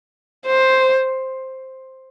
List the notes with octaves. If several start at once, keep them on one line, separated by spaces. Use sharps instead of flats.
C5